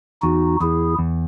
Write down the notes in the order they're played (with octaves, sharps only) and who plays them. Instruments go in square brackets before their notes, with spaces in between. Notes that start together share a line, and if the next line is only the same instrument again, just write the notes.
[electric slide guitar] E2 [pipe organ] D#4 F#4
[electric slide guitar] E2 [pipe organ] E4 G#4
[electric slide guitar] E2